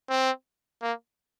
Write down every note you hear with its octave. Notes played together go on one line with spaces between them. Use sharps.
C4
A#3